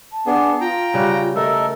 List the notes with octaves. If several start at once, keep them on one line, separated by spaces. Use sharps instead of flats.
A5
B3 D4 G#4
F4 G5 A#5
C#3 G3 F#4
A3 A4 A#4 D#5